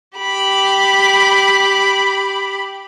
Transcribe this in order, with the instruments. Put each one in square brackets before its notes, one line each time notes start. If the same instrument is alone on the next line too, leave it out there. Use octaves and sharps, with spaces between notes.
[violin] G4 B5